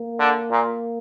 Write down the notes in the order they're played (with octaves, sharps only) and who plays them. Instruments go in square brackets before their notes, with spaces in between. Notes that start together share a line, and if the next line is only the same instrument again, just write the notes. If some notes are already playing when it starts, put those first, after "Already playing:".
Already playing: [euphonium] A#3
[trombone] D3
A#2